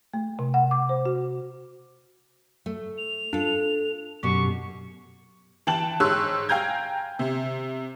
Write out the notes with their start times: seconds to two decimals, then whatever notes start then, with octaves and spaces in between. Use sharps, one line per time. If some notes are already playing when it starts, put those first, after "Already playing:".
0.13 A3
0.39 C3
0.54 F#5
0.71 D6
0.89 C5
1.06 F#4
2.66 A3
2.98 F7
3.33 D4 F4 A4
4.23 F#2 B2 G4 C#6
5.67 E3 G5 A5 F#7
6.00 G#2 C#5 E6 F#6
6.49 F5 G5 G#5 A#5 G6 G#6
7.19 C3